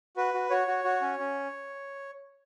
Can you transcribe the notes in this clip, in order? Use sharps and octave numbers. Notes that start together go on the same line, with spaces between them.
F#4 B4
F#4
F#4 C#5
F#4
F#4
C#4
C#4